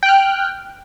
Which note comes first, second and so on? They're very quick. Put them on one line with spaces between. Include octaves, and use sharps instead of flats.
G5 F#6 F6